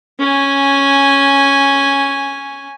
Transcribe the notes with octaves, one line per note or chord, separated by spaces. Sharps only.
C#4 G#5